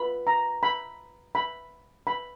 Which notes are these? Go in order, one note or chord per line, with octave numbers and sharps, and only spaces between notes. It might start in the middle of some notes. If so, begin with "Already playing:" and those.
Already playing: F4 B4 B5
A#5
B5
B5
B5